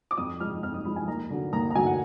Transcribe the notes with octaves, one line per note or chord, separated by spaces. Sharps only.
D6
F2 D#6
F3 G#3 F6
F2 F6
D#6
F3 G#3 B5
G#5
D#2 A#5
D3 F#3
D#2 A#5
A#5
D3 F#3 G#5
F#5